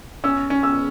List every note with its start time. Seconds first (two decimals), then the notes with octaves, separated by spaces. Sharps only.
0.24 C#4 E6
0.50 C#4
0.63 E6